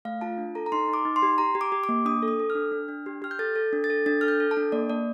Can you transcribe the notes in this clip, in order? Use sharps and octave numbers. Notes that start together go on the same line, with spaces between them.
A3 F5
F4 A5
D4
A4 A#5
A#5
D#4 C6
D#4
D6
D#4
C6
G4
G4 A#5
G4
D6
G4
D6
A#3
D4 D#6
A4
D#6
A4
F6
D4
D4
D4
G4
G4 F6
G6
A4 A6
A4
D4
A6
A4
D4 A6
A4 F6
G6
A4
A5
D4
A#3 D5
A#3 D5